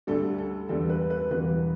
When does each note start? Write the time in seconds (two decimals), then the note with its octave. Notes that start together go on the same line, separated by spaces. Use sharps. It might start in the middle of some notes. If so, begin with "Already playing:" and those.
0.07 D2 D3 G3 A4
0.38 A4
0.69 E2 D3 G3 B3 A4
0.89 B4
1.10 B4
1.30 E1 E2 E3 G3 B4